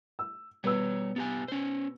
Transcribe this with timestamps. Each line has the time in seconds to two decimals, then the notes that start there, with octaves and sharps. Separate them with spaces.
0.19 E6
0.64 B2 G3 B4 C#5 E6
1.16 B3 G4 G#5
1.48 C#4 C5